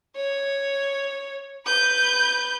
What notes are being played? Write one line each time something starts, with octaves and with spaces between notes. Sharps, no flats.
C#5
B4 G6